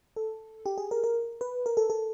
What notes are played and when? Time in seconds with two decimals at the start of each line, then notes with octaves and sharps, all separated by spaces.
0.16 A4
0.66 G4
0.78 G#4
0.91 A#4
1.04 A#4
1.41 B4
1.66 A#4
1.77 A4
1.90 A4